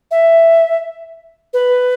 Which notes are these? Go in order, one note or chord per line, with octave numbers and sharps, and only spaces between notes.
E5
B4